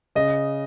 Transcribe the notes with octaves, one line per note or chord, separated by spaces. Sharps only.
C#3 D#5